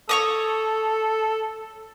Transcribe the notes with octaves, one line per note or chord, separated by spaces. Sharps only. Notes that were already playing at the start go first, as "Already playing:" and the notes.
A4 C#5 C#6 D#6